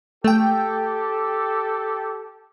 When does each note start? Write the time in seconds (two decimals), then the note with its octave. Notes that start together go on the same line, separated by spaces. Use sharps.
0.24 A3 G4 A4 G5